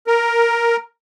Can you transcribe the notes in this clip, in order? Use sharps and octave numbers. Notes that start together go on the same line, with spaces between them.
A#4